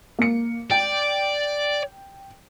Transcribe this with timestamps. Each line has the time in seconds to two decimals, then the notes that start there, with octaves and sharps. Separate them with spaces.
0.19 A#3 C#7
0.71 D5 G5